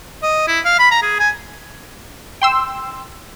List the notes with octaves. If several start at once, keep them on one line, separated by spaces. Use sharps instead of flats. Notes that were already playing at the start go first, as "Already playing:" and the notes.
D#5
E4
F5
B5
A#5
G#4
G#5
G5 C6 E6